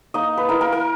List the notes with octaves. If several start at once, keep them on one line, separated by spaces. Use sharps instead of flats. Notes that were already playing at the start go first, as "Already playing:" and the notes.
A#3 D#4 D#5
B4
A#3 E4 A#4
A#4
A#4